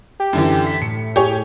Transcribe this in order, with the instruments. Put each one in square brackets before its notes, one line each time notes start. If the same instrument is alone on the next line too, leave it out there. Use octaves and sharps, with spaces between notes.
[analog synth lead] G4
[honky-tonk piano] F#2 D3 E3
[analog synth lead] B6
[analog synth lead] A2 [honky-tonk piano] C#7
[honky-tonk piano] G4 G#4 C#5